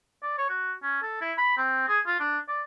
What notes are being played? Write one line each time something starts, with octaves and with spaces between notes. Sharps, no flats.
D5
C#5
F#4
C#4
A4
E4
B5
C4
G#4
F4
D4
D5